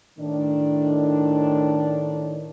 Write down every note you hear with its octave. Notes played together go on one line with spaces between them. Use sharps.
A2 D#3 D4